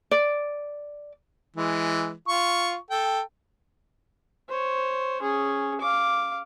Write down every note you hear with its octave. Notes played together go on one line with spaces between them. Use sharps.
D5
E3 G#3
F4 C#6
A4 G5
C5 C#5
C#4 G#4
F5 D6